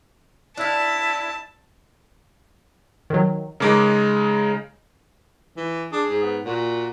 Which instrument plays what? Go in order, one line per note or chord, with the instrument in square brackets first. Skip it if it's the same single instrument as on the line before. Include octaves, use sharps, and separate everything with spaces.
[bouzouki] D4 F5 [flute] E4 [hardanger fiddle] A5
[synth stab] D#3 F#3
[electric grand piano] C#3 G#3 D#4 [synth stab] A#4 D6
[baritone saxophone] E3
[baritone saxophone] D4 [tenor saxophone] G#4
[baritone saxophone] G#2
[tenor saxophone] B3
[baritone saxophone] A#2 [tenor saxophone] F#4